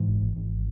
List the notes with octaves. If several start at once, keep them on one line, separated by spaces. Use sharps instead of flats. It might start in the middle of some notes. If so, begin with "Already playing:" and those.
Already playing: G#2 E3
G#1
G#1
G#1